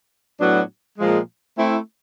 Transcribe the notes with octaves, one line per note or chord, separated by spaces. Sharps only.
A2 F#3 B3 D4 F#4
A#2 F3 G#3
A3 C4 E4